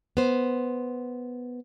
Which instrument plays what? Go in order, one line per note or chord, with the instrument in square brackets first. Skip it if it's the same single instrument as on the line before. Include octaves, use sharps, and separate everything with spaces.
[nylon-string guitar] B3 C5